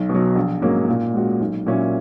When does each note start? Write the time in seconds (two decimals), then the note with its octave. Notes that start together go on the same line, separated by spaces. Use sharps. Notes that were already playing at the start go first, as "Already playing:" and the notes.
Already playing: B1
0.09 B2
0.15 F#3
0.36 A#1
0.62 G#2 F#3 A#3 C#4
0.88 A#2
1.14 G#3 C#4 F#4
1.41 B1
1.66 A#2 F#3 C#4 E4